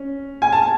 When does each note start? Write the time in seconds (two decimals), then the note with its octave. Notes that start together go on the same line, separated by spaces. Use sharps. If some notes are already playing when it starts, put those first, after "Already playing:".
Already playing: C#4
0.42 G#5
0.52 A5